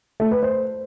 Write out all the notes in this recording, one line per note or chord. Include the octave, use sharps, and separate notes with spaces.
A3
B4
C5